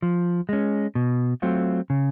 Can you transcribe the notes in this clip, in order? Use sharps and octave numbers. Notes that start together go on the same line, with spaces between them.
F3
G#3 C#4
B2
F#3 A3 C4 F4
C#3